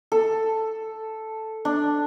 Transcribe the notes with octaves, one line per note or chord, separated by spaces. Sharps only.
A4
D4